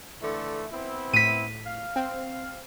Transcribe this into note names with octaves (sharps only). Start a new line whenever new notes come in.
D3 E3 A3
B3 C4 E4
A2 B6 D#7
F5
C4